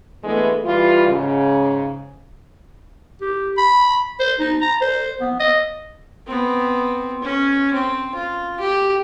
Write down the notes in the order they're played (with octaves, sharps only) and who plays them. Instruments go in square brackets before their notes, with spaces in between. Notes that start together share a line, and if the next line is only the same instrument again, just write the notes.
[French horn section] E3 G#3 A3 B3 D4
E3 G3 F4
G#2 C#3
[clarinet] G4
B5
C5
D#4
A#5
C5
B3
D#5
[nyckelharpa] B3 C4
C#4
C4
F4
G4